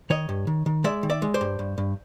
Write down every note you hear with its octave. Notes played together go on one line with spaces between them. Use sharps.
D#3 C#5 D#5
G2
D#3
D#3
G#3 D5 E5
D#3
D5 E5
G#3
C5 D5
G2
G2
G2